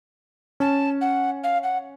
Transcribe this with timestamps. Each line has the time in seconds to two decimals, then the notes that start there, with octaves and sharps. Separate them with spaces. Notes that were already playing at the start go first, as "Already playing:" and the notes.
0.60 C#4 A5
1.01 F#5
1.44 F5
1.63 F#5